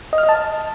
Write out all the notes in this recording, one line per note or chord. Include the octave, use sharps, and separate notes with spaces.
D#5
F6
D#5
A5